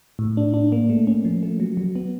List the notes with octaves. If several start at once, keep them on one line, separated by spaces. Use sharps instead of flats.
A2
D4
D4
A#3
A3
C#4
F3
A3
F#3
F#3
B3